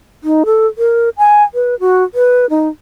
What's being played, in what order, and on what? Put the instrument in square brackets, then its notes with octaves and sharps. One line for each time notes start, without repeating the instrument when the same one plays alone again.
[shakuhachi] D#4
A4
A#4
G#5
B4
F#4
B4
D#4